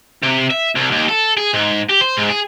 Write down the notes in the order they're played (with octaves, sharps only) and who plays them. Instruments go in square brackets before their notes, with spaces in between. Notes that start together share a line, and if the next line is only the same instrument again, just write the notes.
[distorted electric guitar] C3
E5
C2
D#2
A4
G#4
G#2
G4
C5
G#2
G#4